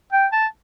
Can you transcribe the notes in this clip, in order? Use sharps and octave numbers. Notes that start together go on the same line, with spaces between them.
G5
A5